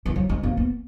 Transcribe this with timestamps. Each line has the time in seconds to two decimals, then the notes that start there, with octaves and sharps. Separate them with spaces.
0.06 E3
0.16 F#3
0.29 G#3
0.43 A#3
0.57 B3